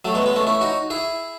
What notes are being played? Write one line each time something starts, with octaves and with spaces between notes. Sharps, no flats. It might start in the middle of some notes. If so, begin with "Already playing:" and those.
F#3 A3
G#3 B3
G#3 B3
A3 C#4
C#4 E4
D#4 F#4
E4 G#4